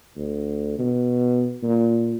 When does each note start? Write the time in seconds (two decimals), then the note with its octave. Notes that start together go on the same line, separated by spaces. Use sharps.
0.17 D2
0.79 B2
1.63 A#2